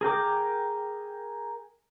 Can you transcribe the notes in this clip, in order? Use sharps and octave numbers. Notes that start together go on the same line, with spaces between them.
G#4 A#4 G5 D6